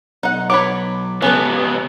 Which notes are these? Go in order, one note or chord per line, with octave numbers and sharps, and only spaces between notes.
B1 D#4 F#5
F#3 B3 C#5 B5 D6
C#2 B3 C#4 A4 B4